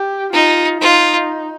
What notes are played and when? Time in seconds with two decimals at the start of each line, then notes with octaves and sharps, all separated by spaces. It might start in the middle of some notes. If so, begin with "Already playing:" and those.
Already playing: G4
0.33 D#4 F4
0.81 D#4 F4